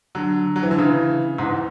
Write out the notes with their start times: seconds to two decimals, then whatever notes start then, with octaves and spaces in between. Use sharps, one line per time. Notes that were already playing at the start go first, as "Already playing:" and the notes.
0.15 D3 F#3
0.56 F#3
0.63 E3
0.71 D3
0.78 C#3 E3
1.38 E2 G#2